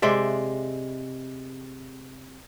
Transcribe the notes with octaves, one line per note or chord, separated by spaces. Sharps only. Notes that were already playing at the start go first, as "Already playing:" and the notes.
C3 G#3 D5 E5